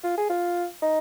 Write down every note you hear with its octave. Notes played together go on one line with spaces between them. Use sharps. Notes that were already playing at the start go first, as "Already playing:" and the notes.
F4
G#4
F4
D#4